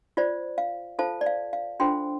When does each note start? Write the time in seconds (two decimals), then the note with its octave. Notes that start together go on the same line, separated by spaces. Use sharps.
0.17 F4 C5 D5
0.58 F5
0.99 F4 A4 C5 F5 A5
1.21 D5
1.26 F5
1.53 F5
1.80 D4 F4 A4 C5 G5 C6